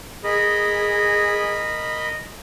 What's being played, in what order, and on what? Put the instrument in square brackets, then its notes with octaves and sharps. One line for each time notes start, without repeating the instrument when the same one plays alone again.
[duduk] G#4 [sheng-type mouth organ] A#4 D#5 B5